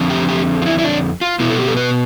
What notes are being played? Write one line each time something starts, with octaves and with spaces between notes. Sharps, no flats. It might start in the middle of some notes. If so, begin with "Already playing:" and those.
Already playing: F2 D3 F3 C4
G4
G4
F4
E4
E4
D4
F4
B2 B3 E4
A4
G4
A4
B4